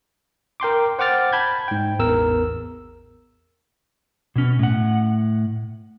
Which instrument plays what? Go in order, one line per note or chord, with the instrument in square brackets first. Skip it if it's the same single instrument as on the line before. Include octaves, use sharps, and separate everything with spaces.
[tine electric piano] A#4 G5 C6 D6
C5 F#5 G5 D6 F6 A6
A5 B5 G6 G#6
G#2 G5
A1 E2 A#4 E6
[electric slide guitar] B2 C#4
A2 F#5